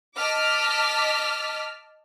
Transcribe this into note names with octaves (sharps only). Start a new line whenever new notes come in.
D#5 A5 D6 F6 B6